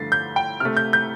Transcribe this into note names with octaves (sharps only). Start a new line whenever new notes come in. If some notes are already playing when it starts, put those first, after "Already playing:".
Already playing: G2 D3 F3 A3 A6 C7
G6
G5
C3 A3 F6
G6
G6